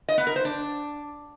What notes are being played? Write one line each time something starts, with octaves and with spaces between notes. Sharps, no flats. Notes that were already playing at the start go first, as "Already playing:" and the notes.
D#5
B3
A#4
C5
D4